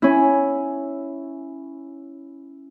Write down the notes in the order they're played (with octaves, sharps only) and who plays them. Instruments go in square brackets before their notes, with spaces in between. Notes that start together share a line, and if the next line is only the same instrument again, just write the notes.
[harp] C#4 E4